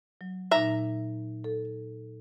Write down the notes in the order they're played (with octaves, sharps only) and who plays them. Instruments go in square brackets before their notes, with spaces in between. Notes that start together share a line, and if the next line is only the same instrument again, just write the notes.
[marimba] F#3
[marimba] A#2 D#4 [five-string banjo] E5 A#5
[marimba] A4